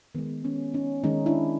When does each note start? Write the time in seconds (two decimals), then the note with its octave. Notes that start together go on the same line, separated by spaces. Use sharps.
0.15 D#3 G#3 B3
0.44 B3 C#4
0.74 C#4 D#4
1.04 D#3 G#3 C#4 D#4
1.26 D4 E4